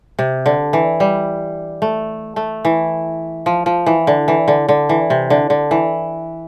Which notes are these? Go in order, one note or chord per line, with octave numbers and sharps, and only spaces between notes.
C3
D3
E3
G3
A3
A3
E3
F3
F3
E3
D3
E3
D3
D3
E3
C3
D3
D3
E3